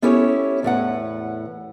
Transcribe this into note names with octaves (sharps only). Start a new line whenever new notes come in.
B3 C#4 E4 G4 A4 C#5
E2 A2 B4 F#5